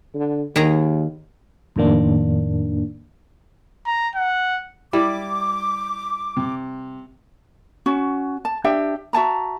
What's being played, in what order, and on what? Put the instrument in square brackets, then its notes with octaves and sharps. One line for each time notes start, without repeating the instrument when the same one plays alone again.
[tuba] D3
[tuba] D#2 [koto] D#3 G#4 A#5
[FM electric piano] F2 A2 D#3 A#3 D4
[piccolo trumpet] A#5
F#5
[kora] G3 [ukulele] E4 [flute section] D6
[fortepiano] C3
[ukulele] C#4 F#4
A5
D4 G4 E5 G5
F#4 E5 A5 A#5